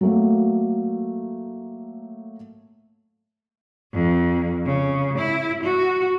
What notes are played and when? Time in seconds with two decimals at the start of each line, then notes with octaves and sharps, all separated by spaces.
0.01 F#3 A3 A#3
3.92 F2
4.65 C#3
5.17 E4
5.63 F#4